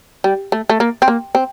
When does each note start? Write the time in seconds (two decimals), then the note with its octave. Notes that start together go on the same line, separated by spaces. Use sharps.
0.24 G3
0.52 A3
0.70 A3
0.80 A#3
1.02 C4
1.08 A#3
1.35 C4